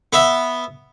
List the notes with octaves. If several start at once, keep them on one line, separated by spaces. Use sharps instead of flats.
B3 E5